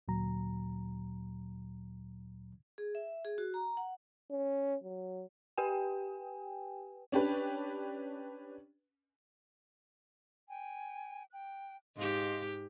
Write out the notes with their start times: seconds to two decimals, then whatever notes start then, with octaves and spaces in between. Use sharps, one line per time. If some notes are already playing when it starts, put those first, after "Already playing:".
0.08 D2 A#2 F#3 A#5
2.78 G#4
2.95 E5
3.25 G#4
3.38 F#4
3.54 A#5
3.77 F#5
4.30 C#4
4.84 F#3
5.58 G4 B4 G5 G#5
7.12 C#4 D4 G4 B4
10.48 G5 G#5
11.31 G5 F#6
11.97 G#2 G4 D#5 F5 C6